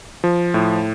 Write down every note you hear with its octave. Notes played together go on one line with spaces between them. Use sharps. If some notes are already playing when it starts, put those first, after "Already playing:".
F3
A2